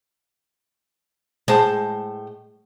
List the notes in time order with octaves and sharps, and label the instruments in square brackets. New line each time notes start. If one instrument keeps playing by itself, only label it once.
[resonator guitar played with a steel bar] A2 C5 A5 [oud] G#3